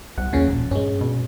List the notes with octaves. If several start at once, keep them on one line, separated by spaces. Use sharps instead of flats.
C2 F#5
E2 A#2 C#3 C#4
E1 A#1
G2 G#3 C#4
B2